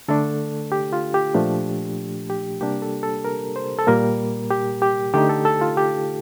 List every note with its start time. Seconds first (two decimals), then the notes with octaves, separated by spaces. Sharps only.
0.08 D3 A3 D4 A4
0.72 G4
0.93 F4
1.14 G4
1.35 A#2 F3 A3 D4
2.30 G4
2.61 C3 G3 A#3 D4 G4
2.82 A4
3.03 A4
3.25 A#4
3.56 C5
3.79 A4
3.87 A#2 G3 A#3 A#4
4.50 G4
4.82 G4
5.14 D3 A3 D#4 G4
5.29 A4
5.45 A4
5.61 F4
5.77 G4